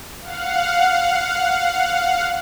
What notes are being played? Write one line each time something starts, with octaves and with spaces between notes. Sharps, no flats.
F5 F#5